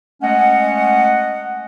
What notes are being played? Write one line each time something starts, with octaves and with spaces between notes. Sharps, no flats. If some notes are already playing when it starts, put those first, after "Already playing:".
G#3 A3 C#4 D#5 F#5